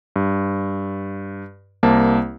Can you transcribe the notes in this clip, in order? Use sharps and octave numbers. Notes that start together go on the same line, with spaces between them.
G2
C2 A#3 C5 A5